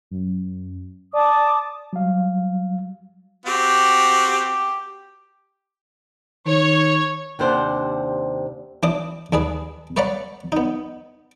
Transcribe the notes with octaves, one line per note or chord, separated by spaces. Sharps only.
F#2
D5 A5 D6 D#6
F#3 G3 F5
C4 F#4 G4
D#3 C#5
D#2 C3 D4 C5 D5 F#5
E3 D4 D6 D#6
D#2 D4 G#4 B4
B4 C#5 D5 F#5 A#5 B5
B3 D#4